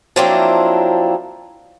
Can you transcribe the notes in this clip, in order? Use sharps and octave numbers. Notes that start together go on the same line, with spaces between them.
F3 F#3 A#3 C4 D4 E4